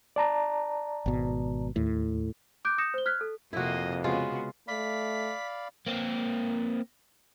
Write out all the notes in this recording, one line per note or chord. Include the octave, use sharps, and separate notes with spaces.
D5 A5 A#5
G#1 B2
D#2 A2
D6 F#6 G6 D7
D#6 G6 A#6 C#7 E7
C5 G7
F6 F#6 G#6 B6
A4
F2 C3 A#3 E4 F#4 D#5
C#3 G#3 B3 F4 F#4
A3 D5 F5 B5 B6
A#3 C4